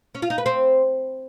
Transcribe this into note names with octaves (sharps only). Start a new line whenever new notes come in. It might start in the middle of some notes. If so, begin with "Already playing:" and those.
C#4
F4
D#4
B4
C4